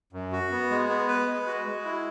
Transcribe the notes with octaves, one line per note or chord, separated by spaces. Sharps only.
F#2
F#4
B3
G#3
B3
B4
G#3
F#4
G#3
E4